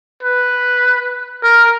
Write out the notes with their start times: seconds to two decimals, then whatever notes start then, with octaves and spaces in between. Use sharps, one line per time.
0.23 B4
1.43 A#4